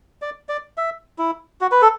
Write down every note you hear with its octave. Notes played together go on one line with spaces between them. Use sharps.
D5
D5
E5
E4
F#4
B4
A4